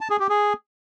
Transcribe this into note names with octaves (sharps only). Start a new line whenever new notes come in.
A5
G#4
G4
G#4